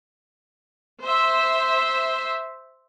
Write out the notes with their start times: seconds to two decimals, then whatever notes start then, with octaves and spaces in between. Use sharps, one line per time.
1.02 C5 E5